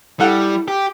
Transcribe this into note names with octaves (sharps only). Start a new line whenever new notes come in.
G3 E4 A4 F#5
G4